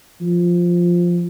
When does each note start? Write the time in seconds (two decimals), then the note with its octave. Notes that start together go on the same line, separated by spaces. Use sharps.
0.21 F3